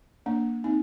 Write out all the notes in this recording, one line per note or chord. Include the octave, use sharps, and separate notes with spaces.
A#3 D4
C4 D#4